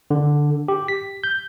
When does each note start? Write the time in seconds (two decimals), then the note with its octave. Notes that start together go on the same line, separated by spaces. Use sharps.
0.11 D3
0.68 G4
0.88 B6
1.24 G6